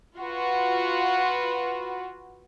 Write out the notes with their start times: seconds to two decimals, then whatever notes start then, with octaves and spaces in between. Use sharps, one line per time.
0.16 F4 F#4 B4